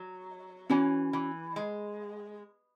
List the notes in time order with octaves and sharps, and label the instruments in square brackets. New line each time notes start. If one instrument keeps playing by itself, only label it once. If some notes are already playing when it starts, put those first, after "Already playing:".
Already playing: [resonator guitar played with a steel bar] F#3
[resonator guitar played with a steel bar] E3 [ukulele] C#4 F#4 C#5 G#5
[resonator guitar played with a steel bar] E3
G#3